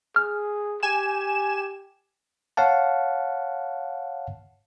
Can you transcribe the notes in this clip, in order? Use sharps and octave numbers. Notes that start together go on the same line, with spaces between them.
G#4 F6
G4 G#5 E7
C#5 F5 F#5 A5